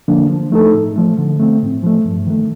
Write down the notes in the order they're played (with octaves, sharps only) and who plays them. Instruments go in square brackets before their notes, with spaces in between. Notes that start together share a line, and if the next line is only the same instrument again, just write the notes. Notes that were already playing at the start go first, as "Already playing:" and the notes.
[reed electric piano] D3 F3 A#3 D4
F3
A3 D#4 A4
A2
F3 A3
D3
A3 C4
A2
F3 A3
G2
D#3 A3